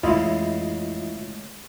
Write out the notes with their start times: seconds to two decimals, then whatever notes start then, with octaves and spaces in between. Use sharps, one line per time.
0.03 F2 A2 C#3 E3 G#3 E4 F4 D#5